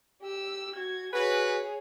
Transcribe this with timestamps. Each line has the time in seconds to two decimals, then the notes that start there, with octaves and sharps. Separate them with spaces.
0.22 G4 E6
0.75 F#4 G#6
1.13 F#4 G#4 B4 C#5